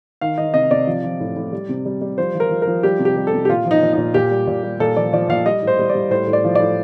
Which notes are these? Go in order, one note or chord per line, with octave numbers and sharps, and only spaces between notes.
D#3 F5
D#3 D#5
C3 D#5
C3 D5
F3
F3
A2
A2
G3
C3
G3
G3
F3 C5
F3
A#4
F3
A#4
F3
G3 G4
C3
G4
G3
A4
C3
G4
A#2 F4
F3
D#4
A#2
A#2 D#4
A#2 G4
G3
A#2
G3
A#2 A4
F3 D5
F3 D5
A#2 F5
G3 D#5
A2
C5
G3
D5
G3
A2 C5
A2
D5
F3
A2 D5